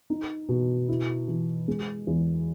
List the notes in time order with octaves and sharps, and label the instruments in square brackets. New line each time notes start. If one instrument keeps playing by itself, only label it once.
[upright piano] D#4
B2
E4
E3
G#3
E2